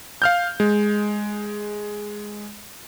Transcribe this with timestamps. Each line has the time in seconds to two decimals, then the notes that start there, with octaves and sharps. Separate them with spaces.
0.22 F5 F6 G6
0.60 G#3